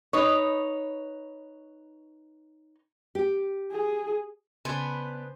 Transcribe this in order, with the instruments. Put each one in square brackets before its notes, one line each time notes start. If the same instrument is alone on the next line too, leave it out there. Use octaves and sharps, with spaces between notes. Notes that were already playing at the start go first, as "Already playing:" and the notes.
[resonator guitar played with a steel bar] D#4 B4 C#5
[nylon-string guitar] G4
[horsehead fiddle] G#4
[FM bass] C#3 [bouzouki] B3 D4 B4 [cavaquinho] C5 G#5